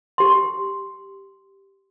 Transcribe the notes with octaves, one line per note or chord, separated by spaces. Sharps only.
G4 C6